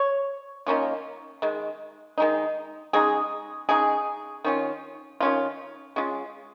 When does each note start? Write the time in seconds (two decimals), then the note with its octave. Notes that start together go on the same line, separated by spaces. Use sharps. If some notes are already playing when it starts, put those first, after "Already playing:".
Already playing: C#5
0.66 D#3 A#3 C#4 F4
1.42 D#3 G#3
2.18 D#3 G#3 D#4
2.93 C#3 G#3 D#4 G#4
3.69 C#3 G#3 D#4 G#4
4.44 D#3 C#4 F4
5.20 D#3 C#4 F4
5.96 G#3 C#4 F4